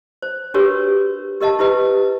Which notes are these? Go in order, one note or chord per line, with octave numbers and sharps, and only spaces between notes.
C5
D4 F#4 G4 A#4 B4 C#5
G4 A#4 D#5 F5 A5
E4 G4 B4 D#5